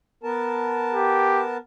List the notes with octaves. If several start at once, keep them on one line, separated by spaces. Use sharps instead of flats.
B3 A#4 A5
G4